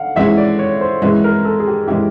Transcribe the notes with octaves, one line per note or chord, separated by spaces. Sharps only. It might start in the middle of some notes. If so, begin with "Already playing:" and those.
Already playing: F5 F#5
E3 G#3 C#4 E4 E5
D5
C#5
C5
E3 G#3 C#4 E4 B4
A#4
A4
G#4
G4
E3 G#3 C#4 E4 G4